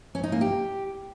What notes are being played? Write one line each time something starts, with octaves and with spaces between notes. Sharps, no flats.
C#4
D#4
A#3
G4